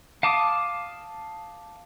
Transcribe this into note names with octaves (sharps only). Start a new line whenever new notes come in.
F5 A5 D6 D#6